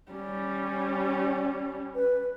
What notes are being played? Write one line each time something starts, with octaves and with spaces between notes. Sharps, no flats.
G3 C#4
B4